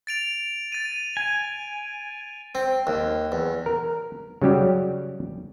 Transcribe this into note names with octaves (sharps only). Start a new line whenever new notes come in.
A6 D7 F7
A6 D#7
G#5
C4
D#2
E2
A#4
C#3 F#3 G3 G4